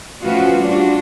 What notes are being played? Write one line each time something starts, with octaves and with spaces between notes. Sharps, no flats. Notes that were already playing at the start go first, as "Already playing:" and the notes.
F3 A3 C#4 F4 F#4 B4
G3 D4 F4 F#4